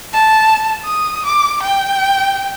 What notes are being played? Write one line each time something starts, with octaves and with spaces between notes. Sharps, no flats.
A5
D#6
D6
G5